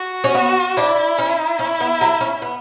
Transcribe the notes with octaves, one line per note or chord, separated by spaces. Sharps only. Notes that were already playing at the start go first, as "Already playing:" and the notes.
Already playing: F#4
C#4
B3
D4 E4
C#4
C#4 E4
B3
F#3
C#4
B3